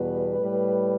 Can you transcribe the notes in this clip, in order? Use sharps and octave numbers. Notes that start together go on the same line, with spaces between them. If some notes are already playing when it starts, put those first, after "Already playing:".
Already playing: E2 B2 G3 B4
A2 G3